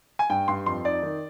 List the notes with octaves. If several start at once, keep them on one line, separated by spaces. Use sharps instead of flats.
G#5
G2 G5
G2 C6
F2 C6
D#4 D5
D#3